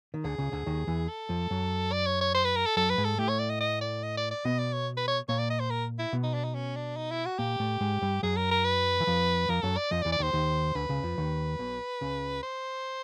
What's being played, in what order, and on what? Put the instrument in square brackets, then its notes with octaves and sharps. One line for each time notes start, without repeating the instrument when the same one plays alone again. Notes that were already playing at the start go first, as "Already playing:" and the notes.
[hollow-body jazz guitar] D#3
[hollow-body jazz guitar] D2 D3 [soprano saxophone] G#4
[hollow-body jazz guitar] C#2 C#3
D2 D3
D#2 D#3
E2 E3
[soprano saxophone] A4
[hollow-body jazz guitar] F2 F3
F#2 F#3
[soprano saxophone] D5
C#5
C#5
C5
B4
A#4
A4
[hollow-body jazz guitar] F#2 F#3 [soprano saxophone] A4
[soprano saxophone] B4
[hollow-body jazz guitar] G#2 G#3
[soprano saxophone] A4
[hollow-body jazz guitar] A2 A3 [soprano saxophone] G4
[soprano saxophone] C#5
D5
D#5
D#5
D5
D#5
D5
D5
[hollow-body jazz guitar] B2 B3 [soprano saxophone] D#5
[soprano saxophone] D5
C#5
B4
C#5
[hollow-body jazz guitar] A#2 A#3 [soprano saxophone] C#5
[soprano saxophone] D5
D#5
C5
A#4
E4
[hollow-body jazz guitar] B2 B3
[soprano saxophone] D#4
D4
D#4
C#4
D4
D#4
E4
F#4
[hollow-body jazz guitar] A#2 A#3 [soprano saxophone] G4
[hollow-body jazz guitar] A2 A3
G#2 G#3
G2 G3
[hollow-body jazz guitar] F#2 F#3 [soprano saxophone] G#4
[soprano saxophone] A#4
A#4
B4
[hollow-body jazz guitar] E3
F2 F3
[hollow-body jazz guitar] F2 F3 [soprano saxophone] A#4
[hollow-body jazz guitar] F#2 F#3 [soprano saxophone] A4
[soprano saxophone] D5
[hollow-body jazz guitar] F2 F3 [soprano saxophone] D#5
[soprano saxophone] D5
[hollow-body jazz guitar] E2 E3
[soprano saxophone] D5
[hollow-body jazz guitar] D#2 D#3 [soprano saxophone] C5
[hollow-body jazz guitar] D#2 D#3
[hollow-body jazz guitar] D2 D3 [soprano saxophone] B4
[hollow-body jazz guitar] C#2 C#3
F2 F3
D#2 D#3
B1 B2
C#2 C#3
[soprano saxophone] C5